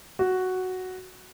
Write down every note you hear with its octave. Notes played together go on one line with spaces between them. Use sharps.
F#4